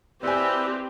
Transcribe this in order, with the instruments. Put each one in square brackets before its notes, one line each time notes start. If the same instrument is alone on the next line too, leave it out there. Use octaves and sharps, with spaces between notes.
[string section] C4 [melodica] E4 B4 [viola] G4 [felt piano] D5 G#5